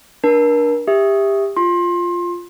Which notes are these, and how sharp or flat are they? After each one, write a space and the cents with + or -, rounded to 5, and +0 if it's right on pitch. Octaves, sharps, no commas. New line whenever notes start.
D4 +0 A#4 +35 A5 +0
G4 +20 E5 +0 D#6 +0
F4 +0 C6 +25